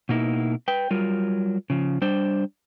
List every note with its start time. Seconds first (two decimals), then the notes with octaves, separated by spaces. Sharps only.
0.09 B2 A#3 D#4 E4
0.68 B4 G5
0.90 F#3 G3 F4 A#4
1.70 C#3 F3
2.02 G3 D4 C5